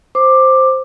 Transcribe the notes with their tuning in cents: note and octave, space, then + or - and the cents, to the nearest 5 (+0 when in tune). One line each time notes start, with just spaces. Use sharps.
C5 +0 D6 +10